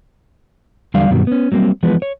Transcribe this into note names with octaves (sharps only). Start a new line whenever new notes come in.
E2 D3 F#3 G3 D5 F5
G2 B2 D#3 F#3 G3
B3 C#4
F#3 G3 A#3 C4
E3 F3 G#3 B3 B4
C#5